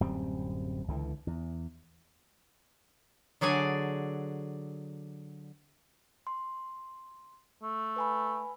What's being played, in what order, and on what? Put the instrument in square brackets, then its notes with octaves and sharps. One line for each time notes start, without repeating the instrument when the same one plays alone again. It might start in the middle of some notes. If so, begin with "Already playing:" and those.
[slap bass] D1 F#2 G3 C4
C#2 D3 E3
E2
[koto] D3 F#3 G#4 D5 G#5
[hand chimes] C6
[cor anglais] A3
[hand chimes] B4 G#5 B5